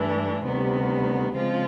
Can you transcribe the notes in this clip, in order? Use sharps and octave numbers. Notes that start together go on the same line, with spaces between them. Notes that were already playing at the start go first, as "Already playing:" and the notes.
Already playing: G2 E3 A3 D4
D2 C3 D#3 G3 B3
C#3 F3 G#3 C4 F4